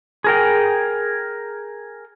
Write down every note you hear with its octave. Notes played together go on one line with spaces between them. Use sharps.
G#4 A#4 G5